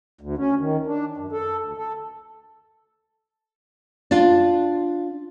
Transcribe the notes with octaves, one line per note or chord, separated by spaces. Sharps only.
D2
C#4
D#3
D4
F#2
A4
D2
A4
D4 F4